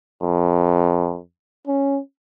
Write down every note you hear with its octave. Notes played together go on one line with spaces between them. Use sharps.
F2
C#4